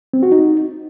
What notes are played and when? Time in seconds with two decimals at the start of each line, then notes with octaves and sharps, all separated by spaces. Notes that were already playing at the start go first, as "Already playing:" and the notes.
0.13 C4
0.23 F#4
0.32 D#4